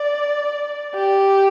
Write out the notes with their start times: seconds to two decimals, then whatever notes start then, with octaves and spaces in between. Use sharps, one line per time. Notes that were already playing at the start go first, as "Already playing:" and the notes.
Already playing: D5
0.95 G4